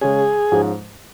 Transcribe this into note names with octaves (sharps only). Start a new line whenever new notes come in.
C#3 G#3 C#4 G#4
G#2 F3 G#3 C#4